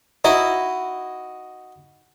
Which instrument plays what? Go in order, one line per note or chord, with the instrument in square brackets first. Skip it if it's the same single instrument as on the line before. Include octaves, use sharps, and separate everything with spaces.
[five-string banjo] D#4 E4 [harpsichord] F#4 D#5